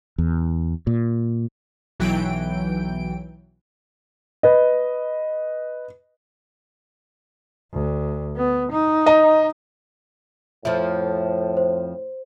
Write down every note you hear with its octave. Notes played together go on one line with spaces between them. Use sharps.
E2
A#2
B1 E3 F#3 G5 D7
B4 D#5
D2
B3
D#4
D#5 A#5
F2 A2 F3 C5 E5
C5